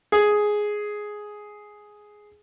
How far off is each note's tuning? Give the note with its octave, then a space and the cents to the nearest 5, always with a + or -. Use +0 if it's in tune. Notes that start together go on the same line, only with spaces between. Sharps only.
G#4 +5